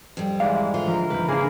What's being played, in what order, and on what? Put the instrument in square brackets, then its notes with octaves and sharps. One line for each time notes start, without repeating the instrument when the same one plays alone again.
[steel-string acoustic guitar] F2 G3
[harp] G#2 E3 [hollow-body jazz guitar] D5 F5
[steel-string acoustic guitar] D3 F4 C5
[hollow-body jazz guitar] F3 [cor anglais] A#4
[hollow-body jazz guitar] C2 F2 F3 [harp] B4
[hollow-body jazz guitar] C#3 D4 [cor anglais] A#3 [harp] G#4